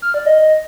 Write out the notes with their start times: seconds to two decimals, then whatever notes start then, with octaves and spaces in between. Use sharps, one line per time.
0.02 F6
0.14 D5
0.26 D#5